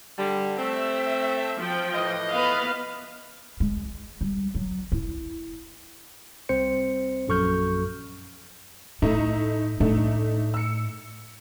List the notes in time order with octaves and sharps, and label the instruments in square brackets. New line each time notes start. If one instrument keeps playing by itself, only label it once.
[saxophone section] D3 G3
[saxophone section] A3 C4 [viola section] E5
[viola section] F3 G5
[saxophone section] A2 E3 D#5
[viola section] B3 B4 F5
[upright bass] G#3
G3
F#3
E4
[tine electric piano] C2 C4 C5 C#7
A#1 F#2 A4 C#6 F6 G6
[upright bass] A2 [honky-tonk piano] A3 D#4 E4
[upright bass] A2 [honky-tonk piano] A3 D4 D#4
[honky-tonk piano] E6 C#7